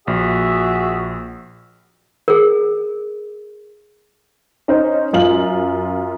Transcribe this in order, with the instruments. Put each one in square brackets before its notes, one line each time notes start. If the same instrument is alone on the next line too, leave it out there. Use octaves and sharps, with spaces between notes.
[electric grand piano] A#1 [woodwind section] F#4 G#4 E5
[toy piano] G#4 A#4
[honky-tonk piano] C#4 D#4 C5
F#2 F4 F#7